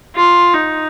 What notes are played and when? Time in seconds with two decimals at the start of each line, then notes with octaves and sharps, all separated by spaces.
0.16 F4
0.54 D#4